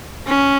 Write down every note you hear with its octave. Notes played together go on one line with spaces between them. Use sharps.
C#4